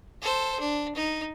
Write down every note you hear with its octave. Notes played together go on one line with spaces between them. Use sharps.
A4 C5
D4
D#4